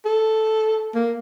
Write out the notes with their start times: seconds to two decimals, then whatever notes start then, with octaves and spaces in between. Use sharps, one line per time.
0.05 A4
0.95 A#3